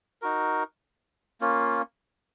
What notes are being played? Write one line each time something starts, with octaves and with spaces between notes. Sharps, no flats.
D#4 F#4 A#4
A#3 C#4 F4